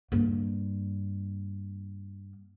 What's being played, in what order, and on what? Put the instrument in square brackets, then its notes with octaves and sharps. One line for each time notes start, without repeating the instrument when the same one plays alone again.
[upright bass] G2 A#3